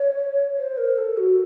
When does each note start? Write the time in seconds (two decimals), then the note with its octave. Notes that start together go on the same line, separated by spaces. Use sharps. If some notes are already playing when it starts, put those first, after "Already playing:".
Already playing: C#5
0.58 C5
0.78 A#4
0.98 A4
1.17 F#4